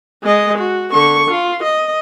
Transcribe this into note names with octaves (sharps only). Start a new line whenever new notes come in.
G#3 D#5
F#4
D3 C#6
F4
D#5